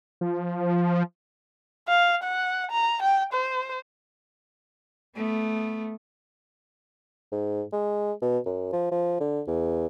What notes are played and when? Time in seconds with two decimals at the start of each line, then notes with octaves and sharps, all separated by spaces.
0.21 F3
1.88 F5
2.23 F#5
2.71 A#5
3.02 G5
3.33 C5
5.15 A3 B3
7.32 G#2
7.72 G#3
8.22 B2
8.45 F#2
8.73 F3
8.91 F3
9.20 D3
9.48 E2